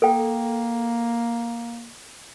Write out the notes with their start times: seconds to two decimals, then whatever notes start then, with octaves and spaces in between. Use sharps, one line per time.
0.02 A#3 A4 G5